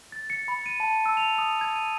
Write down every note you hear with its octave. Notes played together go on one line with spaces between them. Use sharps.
A6
C#7
B5
D#7
A5
E6
F7
D#6
G#6
D#7